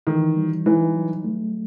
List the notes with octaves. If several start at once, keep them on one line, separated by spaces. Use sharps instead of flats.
D#3 E3
G3
E3 D#4
F#3
A3